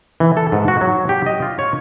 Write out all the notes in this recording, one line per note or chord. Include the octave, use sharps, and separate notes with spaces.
E3
A4
G#2
F#4
F#3
G4
D#5
F4
C#5